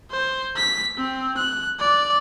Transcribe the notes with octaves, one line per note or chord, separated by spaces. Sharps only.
C5
B6
C4
F#6
D5